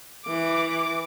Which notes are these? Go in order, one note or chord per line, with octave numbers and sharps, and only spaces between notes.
E3 D6